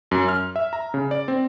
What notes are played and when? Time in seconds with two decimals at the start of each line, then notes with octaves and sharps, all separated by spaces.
0.11 F#2
0.29 F6
0.56 E5
0.73 A#5
0.94 C#3
1.11 D5
1.28 C4